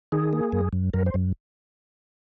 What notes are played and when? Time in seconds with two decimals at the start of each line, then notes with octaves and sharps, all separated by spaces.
0.12 D#3 G#4
0.33 A#3
0.52 F#2
0.73 F#2
0.93 F#2 A#4
1.06 C5
1.14 F#2